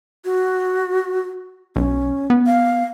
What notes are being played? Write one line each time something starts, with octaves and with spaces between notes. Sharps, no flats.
F#4
B1 C#4
B3
F5